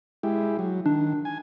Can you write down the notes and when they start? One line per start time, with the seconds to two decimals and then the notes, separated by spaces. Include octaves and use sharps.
0.23 G#3 E4 G4
0.59 F#3
0.86 D#3 D4
1.25 G#5